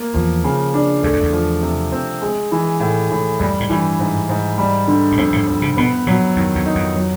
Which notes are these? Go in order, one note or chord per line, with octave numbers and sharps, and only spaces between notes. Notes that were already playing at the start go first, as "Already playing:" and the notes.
Already playing: A#3
E2 F3
C#3
D4
E2 A3
F2
E2
F3
C3
C4
G#3
E3
A2
A2
F2 G3
G#2
G2 E3
G#2
G#2
G3
D3
G2
F2 G#2
A2
F2
C3
B2 B3
A#2 F#3
F2 D#3
E2
D#4
F2
F#3